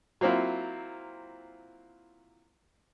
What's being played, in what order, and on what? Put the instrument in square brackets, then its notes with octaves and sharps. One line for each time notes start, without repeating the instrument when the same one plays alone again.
[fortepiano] F#3 A#3 C4 E4 F4